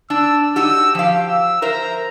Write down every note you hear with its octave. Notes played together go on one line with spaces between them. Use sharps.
D4 E6
D#4 F#4 G4 E6
F3 G4 F5
E6
A#4 C5 E5 A#5